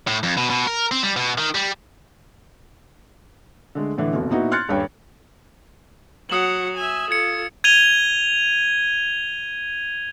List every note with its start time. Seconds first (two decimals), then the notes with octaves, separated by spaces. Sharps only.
0.07 A2
0.23 F2
0.37 B2
0.50 B2
0.67 A#4
0.91 C4
1.03 G3
1.16 B2
1.38 D#3
1.55 G3
3.75 D3 G#3 A3
3.98 A2 D3 E3
4.12 F1 D#2 B2
4.31 A#2 B3 D#4 E4 F#4
4.51 C6 F6 F#6 G#6 A6 C#7
4.69 D#1 G2 G3 C#4 C#5 G5
6.30 F#3 F#5 D#6 E7 F#7
6.77 E5 G#5
7.11 F4 A4 G#6 C#7
7.64 G#6 D#7 F7 G7